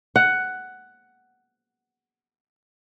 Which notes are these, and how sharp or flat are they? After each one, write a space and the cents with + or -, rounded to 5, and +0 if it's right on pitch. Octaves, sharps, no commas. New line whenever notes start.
F#5 +10